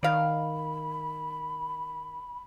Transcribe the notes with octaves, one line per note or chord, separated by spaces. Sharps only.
D#3 D5 F5 B5